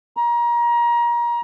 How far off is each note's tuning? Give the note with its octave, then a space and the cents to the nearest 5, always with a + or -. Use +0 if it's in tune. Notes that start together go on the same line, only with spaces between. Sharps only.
A#5 +30